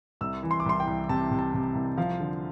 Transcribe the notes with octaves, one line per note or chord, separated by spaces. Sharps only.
C2 E6
E3
C6
D6
C2 C6
G5
C2
C3 A5
C3
A5
C3
C2
F3 F5
D3